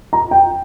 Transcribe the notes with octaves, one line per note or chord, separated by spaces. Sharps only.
A#5
G5